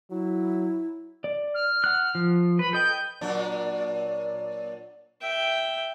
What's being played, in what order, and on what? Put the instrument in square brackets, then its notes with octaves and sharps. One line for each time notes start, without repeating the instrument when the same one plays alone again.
[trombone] F#3 [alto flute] E4
[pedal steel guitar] D5
[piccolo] F6
[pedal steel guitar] F#5 F#6
F3
[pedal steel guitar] B4 [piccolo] B5
[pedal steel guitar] A4 D#5 G5 [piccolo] G6
[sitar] A#2 F#3 D4
[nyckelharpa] E5 G5